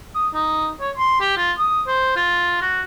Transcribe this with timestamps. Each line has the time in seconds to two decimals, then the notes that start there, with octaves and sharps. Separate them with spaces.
0.15 D#6
0.34 D#4
0.80 C#5
0.97 C6
1.20 G4
1.37 F4
1.58 D#6
1.87 C5
2.16 F4
2.61 F#4